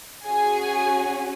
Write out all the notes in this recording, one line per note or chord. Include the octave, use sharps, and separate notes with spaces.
C#4 F#4 G#4 G#5